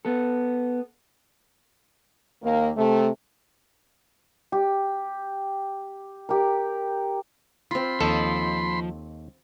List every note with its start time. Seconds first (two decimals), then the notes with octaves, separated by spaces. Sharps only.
0.05 B3 A4
2.43 D#2 A#3
2.77 C3 A3
4.52 G4
6.29 G4 A#4
7.71 C4 F4 B5 C6
8.00 D#2 F3 A4 D#5